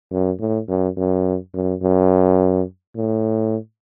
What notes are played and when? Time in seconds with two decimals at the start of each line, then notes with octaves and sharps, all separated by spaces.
0.12 F#2
0.40 A2
0.68 F#2
0.97 F#2
1.54 F#2
1.82 F#2
2.97 A2